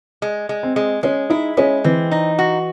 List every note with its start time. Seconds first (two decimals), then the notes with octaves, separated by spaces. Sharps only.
0.22 G#3
0.49 G#3
0.63 C4
0.76 G#3
1.03 G#3 C#4
1.30 D#4 E4
1.57 G#3 C#4
1.84 E3 C4
2.11 D#4
2.39 F#4